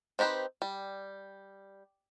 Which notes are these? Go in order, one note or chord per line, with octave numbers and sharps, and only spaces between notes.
C4 D#4 G4 B4 C5
G3